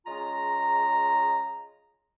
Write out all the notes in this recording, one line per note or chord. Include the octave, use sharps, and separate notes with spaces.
C#3 G#3 F4 A#5